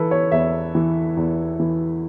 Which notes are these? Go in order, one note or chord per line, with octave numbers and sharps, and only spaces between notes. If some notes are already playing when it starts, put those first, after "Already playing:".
Already playing: E3 E4 A4 B4
C#5
E2 E5
E3
E2
E3